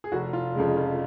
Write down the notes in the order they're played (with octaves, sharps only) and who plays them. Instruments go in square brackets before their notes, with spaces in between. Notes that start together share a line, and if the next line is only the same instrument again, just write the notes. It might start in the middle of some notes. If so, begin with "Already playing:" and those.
[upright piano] G#4
F1 F#4
F4
F2 C#3 G#3
F4